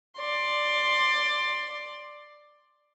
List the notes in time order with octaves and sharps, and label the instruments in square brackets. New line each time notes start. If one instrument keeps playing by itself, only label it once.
[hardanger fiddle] D5 C6